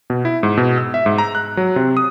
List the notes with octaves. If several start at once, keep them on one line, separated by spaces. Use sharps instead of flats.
B2
E4
G#2
B2
E6
E5
G#2
A#5
F#6
F#3
C3
D#6